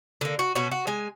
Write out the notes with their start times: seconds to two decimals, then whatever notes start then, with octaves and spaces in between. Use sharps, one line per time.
0.21 D3 A#3
0.39 F#4
0.55 B2 C#4 F#4
0.71 F#4
0.87 G#3 G#5